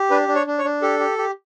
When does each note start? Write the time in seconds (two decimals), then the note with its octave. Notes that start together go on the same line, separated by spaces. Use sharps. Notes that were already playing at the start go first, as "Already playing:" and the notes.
Already playing: G4
0.10 D4 B4
0.28 D4
0.35 C#5
0.47 D4
0.59 C#5
0.64 D4
0.82 G4 A4
0.99 G4
1.18 G4